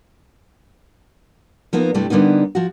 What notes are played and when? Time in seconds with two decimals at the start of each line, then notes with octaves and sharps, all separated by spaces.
1.73 F3 A#3 B3 D#4
1.94 G2 C3 G3 A3 E4 G4
2.10 D3 G3 A#3 B3 D#4
2.55 F3 F#4